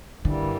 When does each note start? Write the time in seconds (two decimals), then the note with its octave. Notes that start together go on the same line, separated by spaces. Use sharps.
0.25 G2 D3 E3 G3 A#3